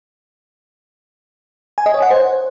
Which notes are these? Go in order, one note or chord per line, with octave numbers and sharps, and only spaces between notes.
G#5
D#5
C#5
F#5
C5